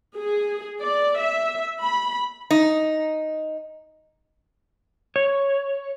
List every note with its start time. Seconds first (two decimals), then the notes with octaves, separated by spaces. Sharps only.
0.17 G#4
0.81 D5
1.18 E5
1.80 B5
2.51 D#4
5.16 C#5